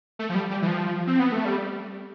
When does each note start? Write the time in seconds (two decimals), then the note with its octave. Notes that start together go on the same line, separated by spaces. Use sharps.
0.19 A3
0.29 F3
0.35 G3
0.50 G3
0.62 E3
0.67 F3
1.07 C4
1.20 B3
1.32 A3
1.45 G3